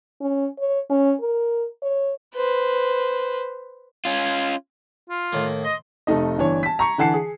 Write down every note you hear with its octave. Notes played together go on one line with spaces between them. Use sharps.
C#4
C#5
C#4
A#4
C#5
B4 C5
C#4 F4
F4
A2 D#3 A#3
D#5 C6
F1 A3 D#4 D#5
G1 E3 D4 C#5
A5 B6
A#5 C#6 C#7
D3 E3 F#5 A5 C7
G#4